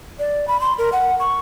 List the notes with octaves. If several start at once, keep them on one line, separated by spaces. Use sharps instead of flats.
D5
B5
C6
A#4
F#5
C#6